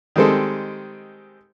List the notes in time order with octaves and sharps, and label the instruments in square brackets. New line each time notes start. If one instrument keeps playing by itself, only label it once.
[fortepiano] D#3 G3 G#3 C4 A4